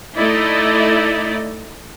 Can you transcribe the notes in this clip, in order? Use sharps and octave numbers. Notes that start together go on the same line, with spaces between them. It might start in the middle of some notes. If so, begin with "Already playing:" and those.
A3 D#4 E4 D5 D#5